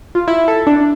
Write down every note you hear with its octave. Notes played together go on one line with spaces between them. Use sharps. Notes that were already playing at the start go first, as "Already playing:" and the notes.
F4
E4
A4
D4